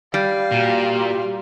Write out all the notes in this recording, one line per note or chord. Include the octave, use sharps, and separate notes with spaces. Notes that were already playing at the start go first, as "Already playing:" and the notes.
G3 F5 B5
A#2 F#4 G4